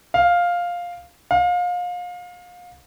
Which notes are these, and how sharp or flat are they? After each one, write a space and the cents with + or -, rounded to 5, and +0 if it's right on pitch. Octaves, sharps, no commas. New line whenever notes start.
F5 +5
F5 +30